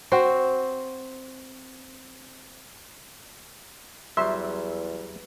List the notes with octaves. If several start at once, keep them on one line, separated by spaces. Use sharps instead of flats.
C4 F#4 C5
E2 F#3 G3 E5 C6